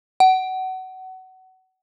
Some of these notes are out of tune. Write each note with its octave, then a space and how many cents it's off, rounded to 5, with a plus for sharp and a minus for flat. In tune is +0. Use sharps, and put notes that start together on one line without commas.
F#5 +25